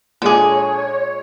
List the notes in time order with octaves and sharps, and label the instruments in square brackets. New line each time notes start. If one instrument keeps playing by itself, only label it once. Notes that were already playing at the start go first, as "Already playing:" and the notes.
[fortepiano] A#2 G#3 D6 [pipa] D3 G#4 [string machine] C#5